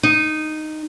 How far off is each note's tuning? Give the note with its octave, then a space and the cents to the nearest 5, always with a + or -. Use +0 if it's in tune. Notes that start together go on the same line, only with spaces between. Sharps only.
D#4 -10